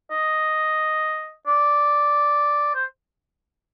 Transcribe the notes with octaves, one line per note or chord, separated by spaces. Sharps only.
D#5
D5
C5